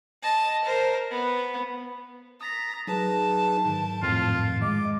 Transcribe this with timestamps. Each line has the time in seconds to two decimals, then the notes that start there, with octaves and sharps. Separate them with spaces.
0.23 D#5 A5
0.64 A#4 C5
1.11 B3
2.41 A#5 D#6 A6 B6
2.87 F#3 D#4 G#4 B4 A5
3.65 G#2 D#3
4.03 F2 A2 F4
4.62 G#3 D#5 D6